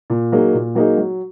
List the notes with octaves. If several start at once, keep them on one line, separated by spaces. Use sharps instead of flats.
A#2
F#3 A#3 D#4 G#4
A#2
F#3 A#3 D#4 G#4
F#3